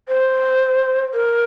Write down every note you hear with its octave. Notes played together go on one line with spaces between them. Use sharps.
C5
A#4